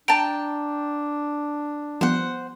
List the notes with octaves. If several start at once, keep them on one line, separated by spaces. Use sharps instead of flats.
D4 G5 A5 A#5 D7
F3 G3 B3 C5 F#5